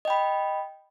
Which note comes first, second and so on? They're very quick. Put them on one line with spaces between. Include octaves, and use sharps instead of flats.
D#5 G5 B5